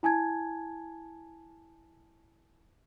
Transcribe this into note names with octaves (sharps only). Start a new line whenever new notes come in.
E4 G#5 A5 G#6